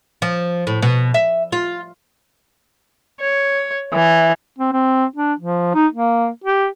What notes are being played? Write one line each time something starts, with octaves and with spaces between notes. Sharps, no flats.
F3
A2
B2
E5
F4
C#5
E3
C4
C4
D4
F3
D#4
A#3
G4